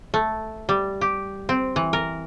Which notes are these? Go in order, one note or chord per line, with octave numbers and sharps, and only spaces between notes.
A3
G3
G4
C4
E3
A#4